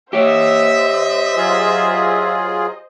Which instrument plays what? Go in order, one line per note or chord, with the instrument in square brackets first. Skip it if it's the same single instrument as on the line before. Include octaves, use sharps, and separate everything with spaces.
[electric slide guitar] G4 C#5 [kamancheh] C5 D#5 [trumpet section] E5
[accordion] F#3 F4 G#4